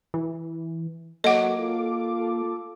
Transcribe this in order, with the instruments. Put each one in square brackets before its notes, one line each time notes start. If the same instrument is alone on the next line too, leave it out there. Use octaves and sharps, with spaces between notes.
[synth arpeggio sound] E3
[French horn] F#3 [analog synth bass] A#3 [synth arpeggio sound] A4 D6 [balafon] D#5 F#5
[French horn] F4